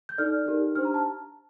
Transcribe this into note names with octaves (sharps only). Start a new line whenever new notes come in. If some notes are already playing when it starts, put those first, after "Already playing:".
G6
D#4 A4 D5 F6
D#4 G4 A#4
D4 G4 C5 F6
A#5
A5